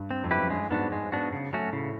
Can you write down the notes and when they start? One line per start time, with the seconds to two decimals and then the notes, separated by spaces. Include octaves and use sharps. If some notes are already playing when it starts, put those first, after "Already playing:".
Already playing: G2
0.11 C4
0.24 F2
0.31 E4 G4 B4
0.37 F#2
0.50 G2 G#3
0.71 G#2 B3 D4 F#4
0.92 G#3
1.12 B3 D4 F#4
1.32 C#3
1.53 F#3 A3 C#4 F#4
1.73 A2 C#3